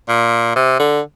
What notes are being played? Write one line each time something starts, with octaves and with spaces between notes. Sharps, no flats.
A#2
C3
D3